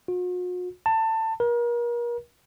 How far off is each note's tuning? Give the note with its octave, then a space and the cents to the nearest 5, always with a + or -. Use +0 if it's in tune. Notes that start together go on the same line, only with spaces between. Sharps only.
F#4 -45
A5 +20
A#4 +35